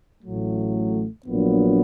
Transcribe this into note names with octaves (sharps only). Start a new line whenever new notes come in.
A1 A2 F#3 A3
A#1 A#2 F#3 B3 D4